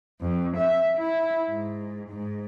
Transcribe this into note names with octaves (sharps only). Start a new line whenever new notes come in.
F2
E5
E4
G#2
G#2